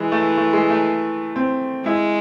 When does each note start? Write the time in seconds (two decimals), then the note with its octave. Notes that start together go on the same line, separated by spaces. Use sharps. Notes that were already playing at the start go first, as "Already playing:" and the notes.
Already playing: E3 G#3
0.12 A3
0.37 A3
0.53 G#3
0.70 A3
1.36 C4
1.85 G#3 E4